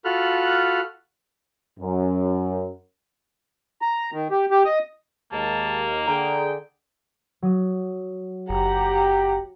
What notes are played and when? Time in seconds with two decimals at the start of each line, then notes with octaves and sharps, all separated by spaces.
0.05 F4 F#4 A4 B5 F6 F#6
1.79 F#2
3.82 A#5
4.13 D#3
4.31 G4
4.51 G4
4.65 D#5
5.32 D#2 D#3 G#3 A#3 A5
6.08 D3 G#4 G5 A#5
7.42 F#3 D#6
8.49 F#1 G4 F#5 A#5